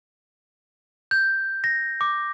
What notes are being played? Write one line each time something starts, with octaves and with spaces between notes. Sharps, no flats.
G6
A#6
D6